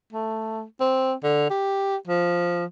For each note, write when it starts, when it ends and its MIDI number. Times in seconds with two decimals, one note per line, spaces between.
0.13 0.63 57
0.81 1.13 60
1.23 1.48 50
1.50 1.97 67
2.08 2.65 53